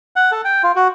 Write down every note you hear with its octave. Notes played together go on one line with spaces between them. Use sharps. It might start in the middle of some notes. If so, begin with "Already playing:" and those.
F#5
A4
G5
F4
F#4